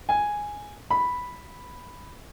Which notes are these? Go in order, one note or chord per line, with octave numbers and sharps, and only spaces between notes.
G#5
B5